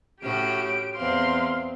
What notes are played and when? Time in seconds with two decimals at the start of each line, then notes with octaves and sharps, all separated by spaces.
0.22 A2 C#4 F#4 G4 D7
0.97 E2 C4 F5 C6